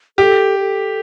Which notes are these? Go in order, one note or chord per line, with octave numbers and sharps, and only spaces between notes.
G4 A4
A4